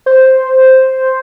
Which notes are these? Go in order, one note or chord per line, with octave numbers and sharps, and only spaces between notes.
C5